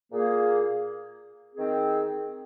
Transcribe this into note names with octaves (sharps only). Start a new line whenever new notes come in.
A#2 A#3 G#4
D#3 C4 G#4